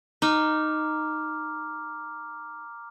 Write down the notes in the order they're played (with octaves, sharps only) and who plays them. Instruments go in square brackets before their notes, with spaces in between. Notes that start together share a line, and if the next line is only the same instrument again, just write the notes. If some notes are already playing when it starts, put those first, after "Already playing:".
[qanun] D#4 [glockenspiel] A#5 D6 F6